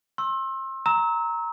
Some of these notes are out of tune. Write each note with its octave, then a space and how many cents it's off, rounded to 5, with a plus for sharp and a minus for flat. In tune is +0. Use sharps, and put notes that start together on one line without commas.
C6 +35 E6 +0
A#5 +0 E6 -30